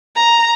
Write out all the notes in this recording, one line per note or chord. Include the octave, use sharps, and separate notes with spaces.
A#5